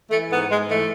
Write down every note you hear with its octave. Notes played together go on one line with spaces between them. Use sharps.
E3 A3
G#2 B3
G#2 G#3
E3 A3